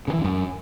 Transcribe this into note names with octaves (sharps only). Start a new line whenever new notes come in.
C#3
E3
E2
F#2